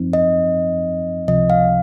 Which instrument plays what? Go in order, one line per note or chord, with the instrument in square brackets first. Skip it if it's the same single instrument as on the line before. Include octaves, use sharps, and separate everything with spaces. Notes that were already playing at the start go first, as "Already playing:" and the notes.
Already playing: [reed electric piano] F#2 F3 C4 D#4
[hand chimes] D#5
[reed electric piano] C#2 C3 F3 [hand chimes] D#5
[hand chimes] F5